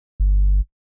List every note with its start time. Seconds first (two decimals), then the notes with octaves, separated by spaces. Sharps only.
0.20 G1